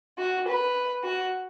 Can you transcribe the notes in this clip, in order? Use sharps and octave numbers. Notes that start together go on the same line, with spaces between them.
F#4
B4
F#4